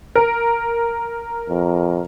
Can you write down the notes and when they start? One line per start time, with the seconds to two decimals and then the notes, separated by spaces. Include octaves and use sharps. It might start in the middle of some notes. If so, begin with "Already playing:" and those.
0.15 A#4
1.49 F2